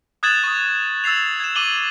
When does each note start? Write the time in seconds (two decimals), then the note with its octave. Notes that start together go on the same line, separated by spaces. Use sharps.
0.23 D#6 F#6 G#6 A6 E7 F#7
0.44 C#6 D#6
1.04 E6 A6 C7 F7
1.40 G#6 E7
1.55 D6 D#7 F#7 G7